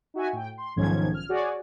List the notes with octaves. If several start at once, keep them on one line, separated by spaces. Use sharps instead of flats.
D#4 F#4 E5 G#5
A2 G5
C6
B1 G#2 D#3 F3 C#4 G#6
F6
F#4 G#4 C#5 D5 F#5 G#5